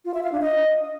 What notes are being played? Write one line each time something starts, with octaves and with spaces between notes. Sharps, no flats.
F4
E5
F5
D4
D#5